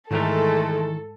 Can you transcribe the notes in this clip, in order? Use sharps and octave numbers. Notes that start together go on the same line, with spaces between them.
G#2 D#3 E3 G#3 A3 A4 A#4